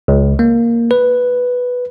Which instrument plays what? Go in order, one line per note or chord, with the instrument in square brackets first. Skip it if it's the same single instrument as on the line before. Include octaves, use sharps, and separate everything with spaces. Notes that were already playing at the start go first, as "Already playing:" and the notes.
[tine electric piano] C#2
A#3
B4